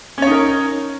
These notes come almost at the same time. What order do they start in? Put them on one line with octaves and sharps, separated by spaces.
C#4 C#5 D#4 A#4